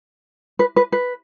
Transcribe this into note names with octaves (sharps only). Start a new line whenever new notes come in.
B4
B4
B4